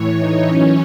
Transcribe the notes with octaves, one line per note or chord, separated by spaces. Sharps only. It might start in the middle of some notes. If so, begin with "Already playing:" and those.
Already playing: A2 E3 C#5
D#4
F#2 E3 C#4